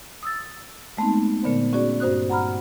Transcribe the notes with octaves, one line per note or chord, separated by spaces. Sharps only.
D#6 E6 A6
G#3 A3 B3 C4 D#4
A#2 D3 B3 C5
C#4 F#4 G#4 D5
G2 F#4 C5 D#6 F#6
F#5 A#5 B5 F6